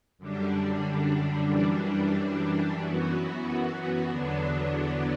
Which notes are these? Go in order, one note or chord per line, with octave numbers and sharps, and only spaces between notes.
F#2 D3 G3 D4
F#2 E3 G3 D4
F#2 E3 B3 F#4
E2 D3 F#3 B3 D4